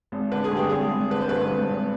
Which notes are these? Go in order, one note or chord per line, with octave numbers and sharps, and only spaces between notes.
G#1
D3 B4
G#4
G2 G4
G#1 G#4
G#1
D3 B4
C5
G2 B4
G#1
G#1